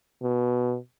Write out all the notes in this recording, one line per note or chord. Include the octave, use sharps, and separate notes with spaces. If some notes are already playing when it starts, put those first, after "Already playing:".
B2